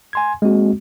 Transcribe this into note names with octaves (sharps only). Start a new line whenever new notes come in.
G#5 C6 G#6
G#3 A#3 C4 F#4